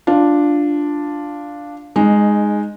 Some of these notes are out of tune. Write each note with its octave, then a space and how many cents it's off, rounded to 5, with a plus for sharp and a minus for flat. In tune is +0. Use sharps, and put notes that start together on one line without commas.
D4 +0 F4 +0
G#3 +0 D#4 -20